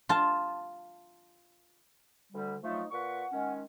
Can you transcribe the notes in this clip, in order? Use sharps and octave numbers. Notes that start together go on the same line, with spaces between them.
F4 A5
D2 D3 G3
F3 F#3 A3 D#4
A#2 B4 F#5 C#6
D#3 G#3 C#4